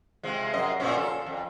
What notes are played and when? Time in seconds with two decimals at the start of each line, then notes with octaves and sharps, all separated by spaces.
0.23 C3 F3 G#3
0.53 F#2 D#5
0.80 A#2 F3 C#4
0.97 A4
1.27 F2